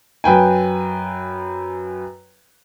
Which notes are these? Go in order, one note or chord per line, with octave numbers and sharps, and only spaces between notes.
F#2 B4 G5 G#5